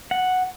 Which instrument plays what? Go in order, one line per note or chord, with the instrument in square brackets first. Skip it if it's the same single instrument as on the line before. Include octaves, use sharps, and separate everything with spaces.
[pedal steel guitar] F#5